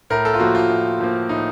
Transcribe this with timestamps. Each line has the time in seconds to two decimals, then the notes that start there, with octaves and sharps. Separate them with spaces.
0.10 A2 A#4
0.25 A4
0.34 F4
0.40 F3 A#3 F#4
0.55 F4
0.70 A2
1.00 F3 A#3
1.29 A2 D#4